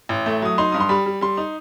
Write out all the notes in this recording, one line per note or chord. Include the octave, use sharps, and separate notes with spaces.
A1
A3
F#3 D#6
D#4 C6
G2 D#6
C6
G3 B5
G3
G3 C6
D#4